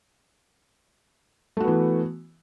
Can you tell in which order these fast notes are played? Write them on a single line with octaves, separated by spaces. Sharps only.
A3 F#4 B3 E3